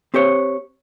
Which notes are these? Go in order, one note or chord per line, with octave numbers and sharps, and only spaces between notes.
C4 G4 C5 C#5